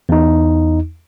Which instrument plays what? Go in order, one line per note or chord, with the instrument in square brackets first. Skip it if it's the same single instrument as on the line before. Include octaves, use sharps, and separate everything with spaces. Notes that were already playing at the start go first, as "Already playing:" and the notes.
[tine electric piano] E2 D#4